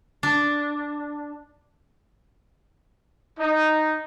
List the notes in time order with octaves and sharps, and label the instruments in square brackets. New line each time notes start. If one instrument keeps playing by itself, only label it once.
[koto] D4
[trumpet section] D#4